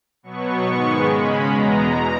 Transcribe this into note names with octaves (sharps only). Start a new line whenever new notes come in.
B2 F#3 B3 C#6
G#2 D#3 G#3 B3
C#3 G#3 C#4 B5
E2 B2 G#3 B3 A#5
E2 B2